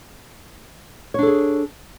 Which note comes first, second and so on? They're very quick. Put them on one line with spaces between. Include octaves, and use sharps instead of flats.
C#5 D4 A4 G#4